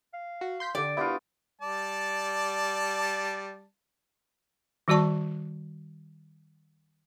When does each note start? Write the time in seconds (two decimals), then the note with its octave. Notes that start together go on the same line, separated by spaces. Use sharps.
0.14 F5
0.41 F#4
0.60 C6 G6 B6
0.75 D3 G4 D5
0.97 B3 D4 E4 F4 G4
1.62 G3 D5 A5
4.88 D#3 G3 F#4 D5 A5 C#6